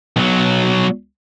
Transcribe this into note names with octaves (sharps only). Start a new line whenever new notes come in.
B1 F#3